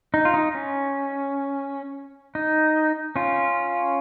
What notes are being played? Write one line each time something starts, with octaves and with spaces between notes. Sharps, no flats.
D#4
F4
D#4
C#4
D#4
C#4 F4